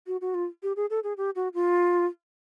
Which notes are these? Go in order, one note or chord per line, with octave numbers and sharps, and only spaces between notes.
F#4
F#4
F4
G4
G#4
A4
G#4
G4
F#4
F4